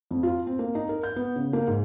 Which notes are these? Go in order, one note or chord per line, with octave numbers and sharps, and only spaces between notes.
F2
F4
C4
A#3
D#4
A#4
G6
B3
C#3
A#3
G#2